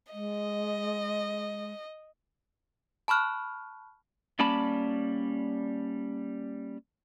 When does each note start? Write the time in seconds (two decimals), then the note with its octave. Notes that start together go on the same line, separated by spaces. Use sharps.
0.13 G#3 D#5
3.08 A5 B5 C#6 F6 F#6
4.39 G3 A#3 C#4 D5 A5 B5